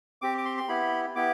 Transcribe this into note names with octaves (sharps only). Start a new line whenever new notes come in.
C4 G4 D6
D6
C6
C6
B3 E4 G4 B5
B3 E4 G4 D6